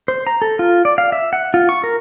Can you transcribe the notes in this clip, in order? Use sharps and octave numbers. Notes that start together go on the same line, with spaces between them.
C5
A#5
A4
F4
D5
F5
E5
F#5
F4
C#6
A#4